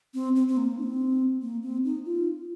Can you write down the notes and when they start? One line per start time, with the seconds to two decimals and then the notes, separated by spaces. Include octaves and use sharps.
0.14 C4
0.36 C4
0.48 C4
0.57 A#3
0.78 D#4
0.83 C4
1.42 A#3
1.63 C4
1.85 D#4
2.06 F4